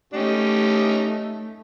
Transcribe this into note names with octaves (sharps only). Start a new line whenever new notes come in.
A3 C#4 D#4 G4